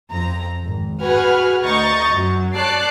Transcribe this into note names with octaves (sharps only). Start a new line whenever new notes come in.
F2 A#5
G#1
F#4 G#4 B4 F#5 G#5 F6
D2 D#5 A#5 C#6 G6 A6
F#2 F#3
C#5 D5 A5 D6 F#6 C7